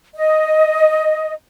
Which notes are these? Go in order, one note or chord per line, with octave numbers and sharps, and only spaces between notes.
D#5